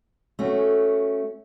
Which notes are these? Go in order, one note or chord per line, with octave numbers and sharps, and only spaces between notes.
A3 C#4 F#4